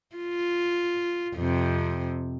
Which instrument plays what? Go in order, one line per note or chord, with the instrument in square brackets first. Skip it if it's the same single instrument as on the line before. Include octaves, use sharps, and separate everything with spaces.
[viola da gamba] F4
F2 C3